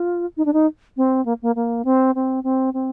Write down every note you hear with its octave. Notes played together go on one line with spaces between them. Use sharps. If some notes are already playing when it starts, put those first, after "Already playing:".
Already playing: F4
D#4
D4
D#4
C4
A#3
A#3
A#3
C4
C4
C4
C4